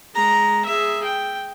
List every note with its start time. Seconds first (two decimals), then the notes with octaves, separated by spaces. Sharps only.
0.15 G#3 A#5
0.66 G#4 E5
1.05 G5